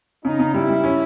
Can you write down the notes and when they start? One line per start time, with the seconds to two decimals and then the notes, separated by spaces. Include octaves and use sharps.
0.25 C#3 D#4
0.39 C#3
0.54 G3 E4
0.69 G3
0.84 C#4